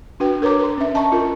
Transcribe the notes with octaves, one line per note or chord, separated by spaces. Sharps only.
D4 F#4 B4 G5
A#4 B4 C#5 A#5 D6
B4 C6
C#4 E5
D#5 A5 A#5 C#6
F4 A#4